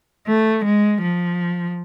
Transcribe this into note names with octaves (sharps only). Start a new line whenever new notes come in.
A3
G#3
F3